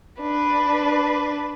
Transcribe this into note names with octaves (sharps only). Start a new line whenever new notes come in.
D4 B4